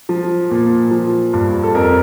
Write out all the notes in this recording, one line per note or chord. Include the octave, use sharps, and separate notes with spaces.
F3
A#2
F3
G2
A4
F2 A#4